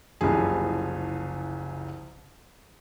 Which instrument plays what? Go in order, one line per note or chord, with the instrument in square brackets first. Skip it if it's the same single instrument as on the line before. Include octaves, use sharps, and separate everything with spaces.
[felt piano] F#1 C2 C#3 F3 G#4